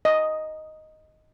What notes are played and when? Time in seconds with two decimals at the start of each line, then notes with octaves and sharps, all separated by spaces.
0.05 D#5